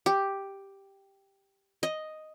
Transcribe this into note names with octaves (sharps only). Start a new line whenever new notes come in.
G4
D#5